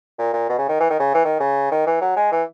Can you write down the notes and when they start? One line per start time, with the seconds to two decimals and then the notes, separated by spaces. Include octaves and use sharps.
0.19 A#2
0.33 A#2
0.49 B2
0.59 C#3
0.69 D#3
0.80 E3
0.90 D#3
0.99 C#3
1.14 E3
1.25 D#3
1.40 C#3
1.71 D#3
1.86 E3
2.01 F#3
2.16 G#3
2.32 E3